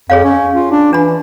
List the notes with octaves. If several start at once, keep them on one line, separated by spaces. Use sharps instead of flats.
F2 G#4 C#5 F5
C#4
F4
D4
E3 D4 B5